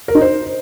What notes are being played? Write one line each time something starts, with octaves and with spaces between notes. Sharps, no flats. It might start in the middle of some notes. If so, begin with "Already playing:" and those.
A#4
D#4
C5